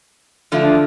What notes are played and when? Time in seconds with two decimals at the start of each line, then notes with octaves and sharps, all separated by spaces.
0.52 D3 F3 A3 D4 F4